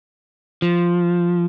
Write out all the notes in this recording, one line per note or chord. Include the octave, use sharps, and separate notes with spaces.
F3